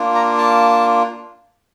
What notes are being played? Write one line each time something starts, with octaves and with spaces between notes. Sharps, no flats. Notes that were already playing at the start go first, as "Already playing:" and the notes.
Already playing: A#3 D4 F4
A#5
A5